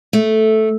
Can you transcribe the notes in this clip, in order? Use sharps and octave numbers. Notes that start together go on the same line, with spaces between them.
A3